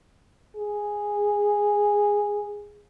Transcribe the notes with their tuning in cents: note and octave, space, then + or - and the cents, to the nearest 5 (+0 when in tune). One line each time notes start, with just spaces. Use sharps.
G#4 -10